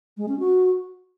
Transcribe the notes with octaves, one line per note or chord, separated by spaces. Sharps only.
G#3
C#4
F#4